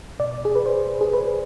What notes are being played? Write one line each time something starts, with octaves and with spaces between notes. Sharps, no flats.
B2 D5
G#4
B4
C5
G#4
B4